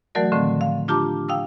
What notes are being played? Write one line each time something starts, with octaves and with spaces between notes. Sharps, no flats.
E3 F#3 A3 F#4 A#4 D5
A2 D3 D#3 F3 A3 C4
F5
D4 F4 G4 A5 A#5 D6
F5 G5 D#6 E6